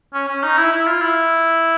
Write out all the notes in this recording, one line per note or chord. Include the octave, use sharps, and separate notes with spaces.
C#4
C#4
D#4
E4
E4
F4
E4